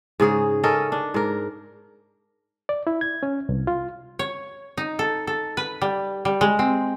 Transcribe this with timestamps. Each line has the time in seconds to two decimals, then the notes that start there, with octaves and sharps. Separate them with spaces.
0.20 G#2 C#3 G#4 C#5
0.64 C#4 A4 A#4 D#5
0.92 D4
1.14 G#2 A#4
2.69 D5
2.87 E4
3.01 G#6
3.23 C#4
3.49 C2
3.67 F4
4.19 C#5
4.77 D#4
4.99 A4
5.27 A4
5.57 B4
5.81 G3
6.25 G3
6.41 G#3
6.59 C4